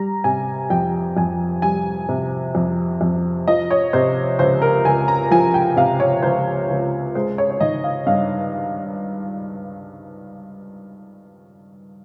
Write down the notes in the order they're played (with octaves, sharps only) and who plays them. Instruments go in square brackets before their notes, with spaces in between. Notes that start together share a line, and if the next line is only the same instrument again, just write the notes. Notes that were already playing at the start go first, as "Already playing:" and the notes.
Already playing: [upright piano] G3 A#5
C3 G#5
F2 G5
F2 G#5
G3 G#5
C3
F2
F2
F3 D#5
C#5
C3 C5
C#2 C5
A#4
C#2 G#5
A#5
F3 G#5
G5
C3 F5
C#5
C#2 C5
C#2
G#3 C5
C#5
C#5
D#3 D#5
F5
G2 F5